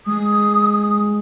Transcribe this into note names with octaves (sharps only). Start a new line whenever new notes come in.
G#3 D#6